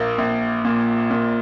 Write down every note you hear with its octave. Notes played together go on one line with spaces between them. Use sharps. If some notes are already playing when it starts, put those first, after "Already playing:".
Already playing: A#1 A#3
A#1
A#2
A#2